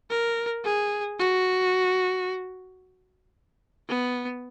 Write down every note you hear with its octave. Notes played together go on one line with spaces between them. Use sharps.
A#4
G#4
F#4
B3